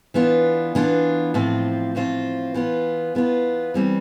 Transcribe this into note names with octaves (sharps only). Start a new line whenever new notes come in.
E3 B3 D4 F4
E3 B3 D4 F4
A2 F3 C4 F4
A2 F3 C4 F4
E3 B3 F4
E3 B3 F4
E3 G3 C4